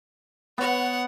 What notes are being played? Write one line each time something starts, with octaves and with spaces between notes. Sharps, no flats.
B3 C#5 F#5